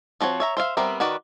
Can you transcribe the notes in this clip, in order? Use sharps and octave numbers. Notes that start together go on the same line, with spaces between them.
F3 C4 F#4 C#5
C#5 E5 A#5
C5 E5 F5
G3 B3 C4 A#4 E5
D#3 F#4 B4 D5 B5